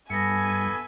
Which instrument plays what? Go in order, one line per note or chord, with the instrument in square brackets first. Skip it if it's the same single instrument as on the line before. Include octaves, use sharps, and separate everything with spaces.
[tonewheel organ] G2 [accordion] B3 A4 E5 [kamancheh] G#5 [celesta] A#6 C#7